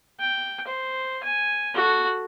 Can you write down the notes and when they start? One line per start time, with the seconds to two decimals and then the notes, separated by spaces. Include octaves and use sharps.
0.20 G5
0.67 C5
1.23 G#5
1.74 F#4 A4